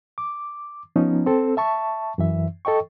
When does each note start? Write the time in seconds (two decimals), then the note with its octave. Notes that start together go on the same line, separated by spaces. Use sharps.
0.18 D6
0.96 F3 B3 C#4 D#4
1.26 C4 A4
1.57 E5 A5 C#6
2.18 F#2 E3 E5
2.65 A4 D#5 G5 C#6